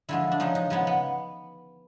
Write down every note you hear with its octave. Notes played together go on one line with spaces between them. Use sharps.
D3 F3 G#3 E4
D4
C#3 F3 G#3 D#4
D#4
C#3 F3 G#3 B3
B3